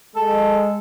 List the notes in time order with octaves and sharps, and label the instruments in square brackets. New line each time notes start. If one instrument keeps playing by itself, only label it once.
[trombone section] G#3 [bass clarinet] A4